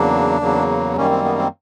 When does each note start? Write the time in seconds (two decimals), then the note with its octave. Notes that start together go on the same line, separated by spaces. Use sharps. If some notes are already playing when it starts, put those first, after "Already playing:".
Already playing: E2 C#3 F#3 A#3 D4
0.41 E2 C#3 F#3 A#3
0.97 F#2 D#3 G3 A#3 C#4
1.11 C4
1.25 B3
1.38 C4